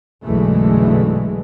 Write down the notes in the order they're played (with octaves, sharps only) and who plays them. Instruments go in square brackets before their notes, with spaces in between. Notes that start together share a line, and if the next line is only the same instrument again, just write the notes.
[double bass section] B1 F#2 D3 E3 G#3 A3